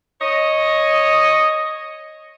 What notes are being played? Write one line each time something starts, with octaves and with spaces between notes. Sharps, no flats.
C#5 D#5